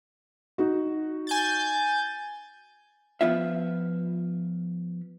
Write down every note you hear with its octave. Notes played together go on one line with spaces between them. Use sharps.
D#4 F#4
G#5 G6 A6
F3 B3 F4 E5